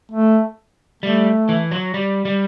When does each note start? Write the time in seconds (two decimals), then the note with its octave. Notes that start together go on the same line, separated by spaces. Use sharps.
0.12 A3
1.03 G3 A3
1.49 E3
1.71 F#3
1.94 G3
2.25 G3